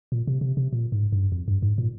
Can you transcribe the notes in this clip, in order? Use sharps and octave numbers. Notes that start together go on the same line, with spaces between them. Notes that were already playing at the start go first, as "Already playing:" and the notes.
A#2
C3
C3
C3
A#2
G#2
G2
F2
G2
G#2
A#2